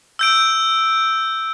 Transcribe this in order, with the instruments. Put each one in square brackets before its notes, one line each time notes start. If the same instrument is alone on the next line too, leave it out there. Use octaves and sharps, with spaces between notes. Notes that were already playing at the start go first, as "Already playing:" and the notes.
[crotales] E6 G6 D7